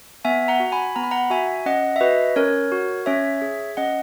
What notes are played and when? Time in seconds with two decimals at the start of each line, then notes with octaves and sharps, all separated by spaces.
0.25 B3 E5 G#5
0.48 F#5 A#5
0.60 F#4
0.72 G#5 B5
0.96 B3 A#5
1.04 B5
1.11 F#5 A#5
1.30 F#4 E5 G#5
1.66 C#4 D#5 F#5
1.96 E5
2.01 F#4 B4 D#5
2.36 C#4 A#4 C#5
2.72 F#4
3.06 C#4 C#5 E5
3.42 G#4
3.77 C#4 D#5 F#5